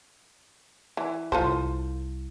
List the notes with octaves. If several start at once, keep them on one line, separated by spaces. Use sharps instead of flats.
E3
C2 E4 F4 A4 C5